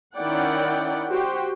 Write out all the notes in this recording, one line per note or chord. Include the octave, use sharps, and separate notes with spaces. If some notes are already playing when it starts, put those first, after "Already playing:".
D#3 C#4 E4 D5 F#5 G5
F#4 G4 C5 G5